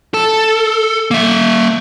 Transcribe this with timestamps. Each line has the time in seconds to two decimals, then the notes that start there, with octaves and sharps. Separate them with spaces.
0.14 A4
1.11 A#3 E5